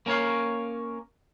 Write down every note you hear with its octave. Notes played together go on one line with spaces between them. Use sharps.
A#3 C#4 A#4 C#5 F5